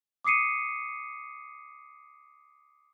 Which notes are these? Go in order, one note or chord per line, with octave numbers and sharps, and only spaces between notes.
D6 D#6 C7 C#7 D#7